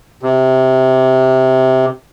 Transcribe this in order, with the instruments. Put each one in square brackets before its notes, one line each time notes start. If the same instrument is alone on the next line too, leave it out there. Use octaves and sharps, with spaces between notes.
[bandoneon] C3